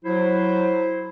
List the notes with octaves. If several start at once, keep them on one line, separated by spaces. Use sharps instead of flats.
F#3 E4 C5